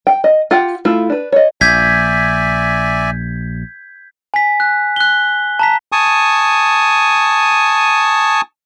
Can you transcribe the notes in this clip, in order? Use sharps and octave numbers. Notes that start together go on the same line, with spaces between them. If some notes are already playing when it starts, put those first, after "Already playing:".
G5
D#5
F4 G4 F#5 G5
A3 E4 F4
D4 B4
C#5 D#5
A#1 D5 E5 G#5 G6 G#6 B6
G#5 B6
F#6
F#6 G7
A5 A#5 B6
G#5 A5 C#6 D#6